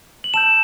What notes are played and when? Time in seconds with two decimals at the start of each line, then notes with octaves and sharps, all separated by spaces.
0.24 F#7
0.34 A5 E6 G6 E7